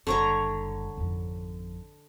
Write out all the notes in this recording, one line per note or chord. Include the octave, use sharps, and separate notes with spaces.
F#1 D3 G3 C#5 A#5
G#1 F2